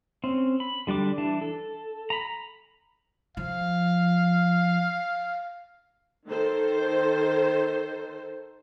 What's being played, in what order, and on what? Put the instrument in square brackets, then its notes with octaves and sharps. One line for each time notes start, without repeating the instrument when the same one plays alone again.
[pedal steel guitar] C4 C#4
B5
D3 G3 D4 D6
E3 D4 A5
A4
A#5 B5
[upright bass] F3 [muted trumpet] F5
[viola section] D#3 A4 C5